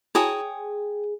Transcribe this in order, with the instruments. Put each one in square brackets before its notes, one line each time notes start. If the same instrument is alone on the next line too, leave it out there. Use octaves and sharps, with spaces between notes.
[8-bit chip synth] E4 F#4 A5 [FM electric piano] G#4 [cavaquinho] C#5 G5 D#6